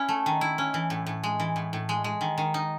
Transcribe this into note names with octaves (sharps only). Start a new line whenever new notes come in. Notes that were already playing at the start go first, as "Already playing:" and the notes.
Already playing: C#4 E4
A3
D#3
E4
C#4
E3
A2
A2
G#3
E3
A2
A2
G#3
G#3
D#3
D#3
D#4